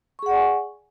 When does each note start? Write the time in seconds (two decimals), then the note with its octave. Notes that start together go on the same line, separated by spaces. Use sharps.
0.19 C#6
0.23 G#4
0.26 F#5
0.30 D5
0.33 G#5